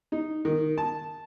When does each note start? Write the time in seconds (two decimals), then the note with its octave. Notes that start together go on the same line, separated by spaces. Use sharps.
0.12 D#4
0.45 D#3
0.78 A5